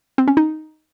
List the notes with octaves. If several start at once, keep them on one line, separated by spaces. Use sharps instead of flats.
C4
C#4
D#4